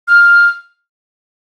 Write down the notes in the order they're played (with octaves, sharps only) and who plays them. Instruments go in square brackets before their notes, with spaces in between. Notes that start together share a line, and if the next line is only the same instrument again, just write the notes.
[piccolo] F6